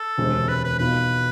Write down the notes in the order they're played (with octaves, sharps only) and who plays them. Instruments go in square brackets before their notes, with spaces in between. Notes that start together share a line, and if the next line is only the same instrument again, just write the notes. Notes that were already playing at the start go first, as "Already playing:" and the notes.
Already playing: [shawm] A4
[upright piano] E1 D2 C3 G#3 C4
[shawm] B4
B4
[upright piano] B1 B2 B3 F4 [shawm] B4